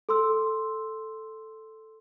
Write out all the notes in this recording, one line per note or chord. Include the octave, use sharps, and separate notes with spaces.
A4 C6 E6